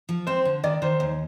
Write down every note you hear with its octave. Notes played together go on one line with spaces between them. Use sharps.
F3
C4 C5
D3
D#3 D5
D#3 C5
D#2